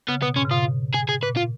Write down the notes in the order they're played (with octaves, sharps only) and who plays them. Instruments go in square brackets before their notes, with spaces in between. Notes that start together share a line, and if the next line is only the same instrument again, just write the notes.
[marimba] C#3 [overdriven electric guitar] B3
[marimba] B2 [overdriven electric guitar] B3
[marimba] G#2 [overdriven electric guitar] C#4
[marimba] C#3
[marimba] B2 [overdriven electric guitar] F4
[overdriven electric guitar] G#4
G#4
[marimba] A#2 [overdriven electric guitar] B4
[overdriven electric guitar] F4